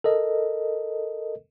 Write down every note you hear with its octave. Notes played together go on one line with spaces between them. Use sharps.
A4 A#4 D#5